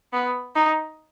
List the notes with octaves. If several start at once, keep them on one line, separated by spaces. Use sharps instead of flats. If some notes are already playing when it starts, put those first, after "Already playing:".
B3
D#4